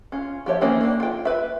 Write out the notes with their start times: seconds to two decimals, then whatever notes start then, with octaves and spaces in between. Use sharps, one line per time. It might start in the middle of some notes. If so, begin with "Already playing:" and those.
0.12 C#4 F4
0.46 F3 G4 C#5 E5
0.61 D#3 E3 A#3 C4 C#4
0.81 A#3 D4
1.00 F4 G5
1.25 B4 E5